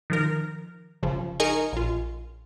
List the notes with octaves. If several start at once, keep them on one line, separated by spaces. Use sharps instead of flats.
D#3 F3 A#4
G1 C#3 F3
D#4 G#4 A#4 D#5 G#5 C#6
A#1 F4